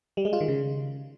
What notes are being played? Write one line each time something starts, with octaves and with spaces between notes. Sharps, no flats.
G3
G#3
F4
D#3
C#3